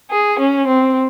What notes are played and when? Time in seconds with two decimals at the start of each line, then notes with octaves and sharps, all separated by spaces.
0.10 G#4
0.39 C#4
0.67 C4